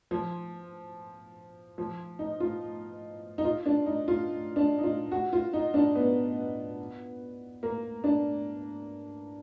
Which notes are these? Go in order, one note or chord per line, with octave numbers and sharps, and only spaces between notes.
F3
F3
D#4
F4
D#4
F4
D4
D#4
F4
D4
D#4
F4
F#4
F4
D#4
D4
B3
A#3
D4